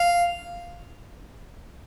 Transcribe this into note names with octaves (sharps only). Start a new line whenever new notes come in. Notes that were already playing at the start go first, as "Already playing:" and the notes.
Already playing: F5